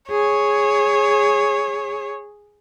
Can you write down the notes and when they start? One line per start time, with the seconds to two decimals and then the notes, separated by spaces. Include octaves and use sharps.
0.11 G#4 C#5